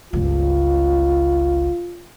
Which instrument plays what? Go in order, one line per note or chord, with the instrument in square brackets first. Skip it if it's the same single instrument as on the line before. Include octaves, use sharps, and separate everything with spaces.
[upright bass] G1 C#2 [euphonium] F4